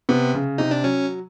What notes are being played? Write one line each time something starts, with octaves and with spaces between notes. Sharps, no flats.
C3 B3
C#3
C3 D#4
D4
F#3 C#4